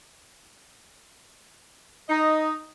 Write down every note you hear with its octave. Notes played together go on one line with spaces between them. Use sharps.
D#4 D#5